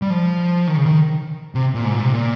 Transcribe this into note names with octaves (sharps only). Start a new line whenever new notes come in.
G3
F3
D#3
C#3
D#3
C3
A#2
G#2
A#2
C3
A#2